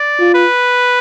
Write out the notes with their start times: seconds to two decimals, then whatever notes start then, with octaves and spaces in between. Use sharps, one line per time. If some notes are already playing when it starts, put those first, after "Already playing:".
Already playing: D5
0.19 F4
0.34 B4